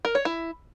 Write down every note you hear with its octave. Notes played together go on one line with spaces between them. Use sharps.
A#4
C#5
E4